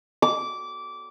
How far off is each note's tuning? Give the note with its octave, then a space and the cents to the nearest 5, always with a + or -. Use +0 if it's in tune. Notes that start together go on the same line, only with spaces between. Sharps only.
D6 -15